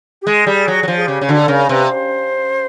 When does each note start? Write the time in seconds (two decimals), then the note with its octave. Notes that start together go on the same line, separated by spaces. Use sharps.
0.22 G4
0.26 G#3 G#4
0.47 G3
0.68 F#3
0.83 F#3
0.88 F3
0.96 G#4
1.08 C#3 G4
1.21 C#3
1.28 D3 F#4
1.39 A4
1.48 C#3 A#4
1.69 C3 B4
1.90 C5